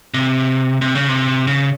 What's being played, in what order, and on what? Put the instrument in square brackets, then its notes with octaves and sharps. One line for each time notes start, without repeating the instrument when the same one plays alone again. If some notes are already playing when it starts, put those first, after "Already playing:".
[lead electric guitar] C3
C3
C#3
C3
C#3